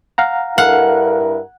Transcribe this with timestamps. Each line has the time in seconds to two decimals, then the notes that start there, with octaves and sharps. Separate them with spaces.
0.18 F5 F#5 A#5
0.58 G2 D4 E4 A4 A#4 F5 F#5